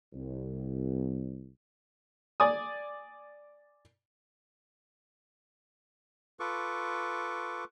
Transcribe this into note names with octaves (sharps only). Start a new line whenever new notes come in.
C2
D5 G#5 D#6
F4 A4 B4 C#6 D6